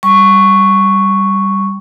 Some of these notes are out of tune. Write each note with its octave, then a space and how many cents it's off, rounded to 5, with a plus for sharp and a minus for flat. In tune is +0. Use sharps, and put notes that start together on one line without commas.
G3 +0 C#6 +0